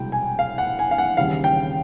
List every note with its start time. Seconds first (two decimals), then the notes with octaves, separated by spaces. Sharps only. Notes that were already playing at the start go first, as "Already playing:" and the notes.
Already playing: C2 B2 G#3 G5
0.12 G#5
0.39 F5
0.58 F#5
0.79 G#5
0.91 F5
0.98 F#5
1.17 D#2 C#3 E3 G3 F5
1.44 G5